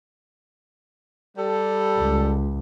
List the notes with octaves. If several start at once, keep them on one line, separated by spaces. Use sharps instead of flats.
G3 A4
C#2